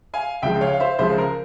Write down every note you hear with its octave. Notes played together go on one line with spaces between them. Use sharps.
F5 G#5
C#2 C#3 F3 E5 G5
C#5 F5
F5
C5 E5
C#2 C#3 F3 C5 E5
A#4